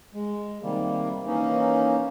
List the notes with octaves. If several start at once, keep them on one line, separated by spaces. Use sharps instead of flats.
G#3
C3 D#3 G3 A#3
E3 A#3 C#4 D#4